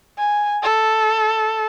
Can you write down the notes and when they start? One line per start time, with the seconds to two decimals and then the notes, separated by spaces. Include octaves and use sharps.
0.18 G#5
0.63 A4